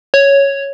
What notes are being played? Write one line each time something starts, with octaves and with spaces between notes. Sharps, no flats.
C#5